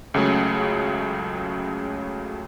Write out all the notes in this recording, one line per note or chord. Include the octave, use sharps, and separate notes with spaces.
C#2 C#3 F#3 A3 G#4